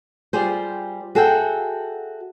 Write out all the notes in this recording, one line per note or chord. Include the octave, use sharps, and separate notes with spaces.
G3 F4 G4 G#4 C5
F#4 G#4 A4 E5 F#5 G5